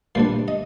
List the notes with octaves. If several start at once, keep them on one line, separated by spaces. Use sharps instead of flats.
A#2 G3 D4 C5
D#5